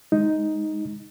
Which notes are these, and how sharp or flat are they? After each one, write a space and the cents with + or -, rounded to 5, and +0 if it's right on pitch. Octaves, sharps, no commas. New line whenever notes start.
G#3 +0 D#4 +5